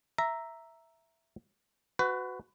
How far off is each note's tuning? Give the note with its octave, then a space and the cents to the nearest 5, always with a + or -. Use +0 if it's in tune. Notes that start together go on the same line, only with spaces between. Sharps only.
E5 +0 A#5 +0
F#4 +0 B4 +30